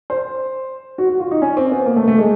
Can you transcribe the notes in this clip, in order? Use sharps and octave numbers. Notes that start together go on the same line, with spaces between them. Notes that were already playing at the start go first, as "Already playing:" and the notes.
C5
F#4
F#4
F4
D#4
C#4
C4
B3
A#3
A3
A3
G#3